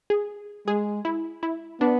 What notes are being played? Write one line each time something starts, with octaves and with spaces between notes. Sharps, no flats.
G#4
G#3 G#4
E4
E4
B3 D4